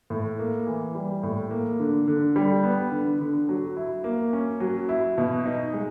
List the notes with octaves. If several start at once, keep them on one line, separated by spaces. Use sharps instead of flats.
A2
A#3
E3
G3
A2
A#3
D3
D3
G3
B3
D3
D3
F#3
E4
A#3
C#4
F#3
E4
B2
D#4
G#3